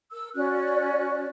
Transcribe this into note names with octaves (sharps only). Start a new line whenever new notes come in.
A#4 E6
C#4 F#4 D5 F#6